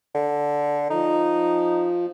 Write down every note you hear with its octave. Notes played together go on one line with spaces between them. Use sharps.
D3
F3 D#4